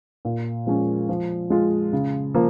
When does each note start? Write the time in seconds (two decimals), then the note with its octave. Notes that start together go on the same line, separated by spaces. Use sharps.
0.25 A#2
0.66 F3 G#3 C#4
1.09 F3
1.50 G#3 F4
1.93 C#3
2.34 F3 A#3